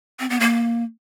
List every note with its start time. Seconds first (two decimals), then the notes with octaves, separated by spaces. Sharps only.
0.20 C4
0.30 B3
0.40 A#3